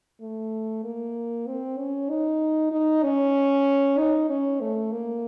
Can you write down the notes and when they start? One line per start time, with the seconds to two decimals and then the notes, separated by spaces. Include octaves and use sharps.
0.21 A3
0.84 A#3
1.47 C4
1.78 C#4
2.10 D#4
2.72 D#4
3.03 C#4
3.98 D#4
4.30 C#4
4.61 A3
4.92 A#3